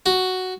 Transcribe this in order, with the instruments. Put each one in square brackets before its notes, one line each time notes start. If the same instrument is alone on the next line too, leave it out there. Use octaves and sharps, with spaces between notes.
[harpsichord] F#4